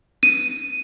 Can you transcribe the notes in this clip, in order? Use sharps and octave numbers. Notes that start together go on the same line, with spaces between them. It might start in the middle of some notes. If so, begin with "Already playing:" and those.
D#7